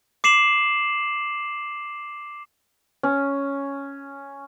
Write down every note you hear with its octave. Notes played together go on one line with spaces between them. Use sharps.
D6 C7 E7 F#7
C#4